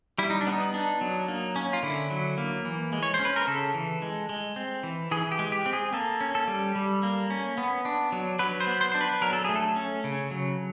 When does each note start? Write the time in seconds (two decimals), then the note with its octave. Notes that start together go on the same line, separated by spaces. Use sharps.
0.18 G3 E4
0.30 D#4
0.41 D4
0.47 B3
0.52 D#4
0.74 D4
1.01 F#3
1.28 A#3
1.56 C#4
1.73 F4
1.83 D3 E4
2.10 F#3
2.38 A#3
2.65 E3
2.93 G#3
3.03 C#5
3.14 C5
3.20 C#4
3.25 B4
3.36 A#4
3.47 C#3 A4
3.74 E3
4.02 G#3
4.29 G#3
4.56 C4
4.83 E3
5.11 E3 G#4
5.32 G4
5.39 G#3
5.52 G4
5.66 C4
5.73 G#4
5.93 A#3 A4
6.21 C#4
6.35 A4
6.48 G3
6.75 G3
7.03 A#3
7.30 C#4
7.58 B3
7.85 D4
8.12 F#3
8.39 F#3 B4
8.60 C5
8.67 B3
8.81 C5
8.92 D4 C5
9.01 B4
9.22 F#3 A#4
9.33 A4
9.45 A3 G#4
9.56 A4
9.76 C#4
10.04 C#3
10.31 F#3